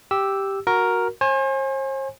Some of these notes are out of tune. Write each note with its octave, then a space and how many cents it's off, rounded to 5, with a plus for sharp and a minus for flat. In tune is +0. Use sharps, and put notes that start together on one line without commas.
G4 +0 E6 +0
F#4 -5 A#4 +5
C5 +45 G#5 +0